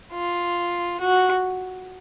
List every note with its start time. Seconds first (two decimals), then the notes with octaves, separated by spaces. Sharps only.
0.13 F4
1.00 F#4